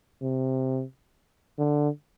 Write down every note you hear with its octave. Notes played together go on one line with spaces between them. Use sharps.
C3
D3